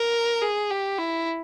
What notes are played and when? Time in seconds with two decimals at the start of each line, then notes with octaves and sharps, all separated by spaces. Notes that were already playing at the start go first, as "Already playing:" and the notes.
Already playing: A#4
0.42 G#4
0.70 G4
0.98 E4